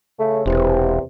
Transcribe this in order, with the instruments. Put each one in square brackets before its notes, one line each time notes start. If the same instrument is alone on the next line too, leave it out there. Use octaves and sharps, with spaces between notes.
[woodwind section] C#3 A3
[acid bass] E1 [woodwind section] E2 C3